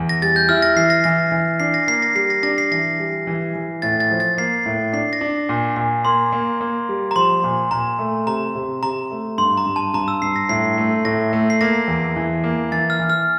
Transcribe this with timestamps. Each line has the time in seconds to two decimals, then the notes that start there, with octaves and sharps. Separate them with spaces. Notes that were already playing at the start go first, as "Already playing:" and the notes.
Already playing: E2
0.09 A#6
0.22 G3 A6
0.36 G6
0.49 E4 F6
0.62 A#6
0.76 E3 C7
0.90 A#6
1.04 E3 A#6
1.32 E3
1.60 D4 C7
1.74 A#6
1.87 A#3 C7
2.02 A#6
2.15 G3 C7
2.30 A#6
2.43 D4 A#6
2.58 C7
2.72 E3 A#6
2.99 G3
3.27 E3
3.55 E3
3.82 A2 A6
4.00 A6
4.11 F3
4.20 A6
4.38 A#3 C7
4.66 A2
4.93 D4 C7
5.13 A#6
5.21 D4
5.49 A#2
5.76 A#2
6.05 A#3 C6
6.32 A#3
6.60 A#3
6.89 G3
7.11 A#5
7.16 F3 C6
7.44 A#2
7.71 A#2 A#5
7.99 A3
8.27 C3 A#5
8.55 C3
8.82 C3 A#5
9.11 A3
9.38 G2 C6
9.57 A#5
9.66 G2
9.76 A5
9.94 G2 A#5
10.08 E6
10.22 G2 C7
10.36 A#6
10.49 A2 C7
10.78 A3
11.05 A2 A#6
11.33 A3
11.50 C7
11.61 A#3 A#6
11.88 E2
12.16 E3
12.44 A#3
12.72 E3 A6
12.90 F6
12.99 E3
13.10 F6